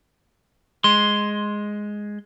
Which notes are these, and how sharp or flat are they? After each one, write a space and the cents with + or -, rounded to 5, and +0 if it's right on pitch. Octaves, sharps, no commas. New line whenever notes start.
G#3 +0 C6 +0